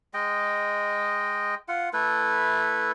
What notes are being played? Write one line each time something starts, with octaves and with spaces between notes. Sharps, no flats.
G#3 D#5 G5
F4 F#5
A3 E4 A4 B4